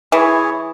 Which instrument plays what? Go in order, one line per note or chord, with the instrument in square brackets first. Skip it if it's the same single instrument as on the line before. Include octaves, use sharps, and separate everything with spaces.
[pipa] E3 [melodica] E4 G#4 C#5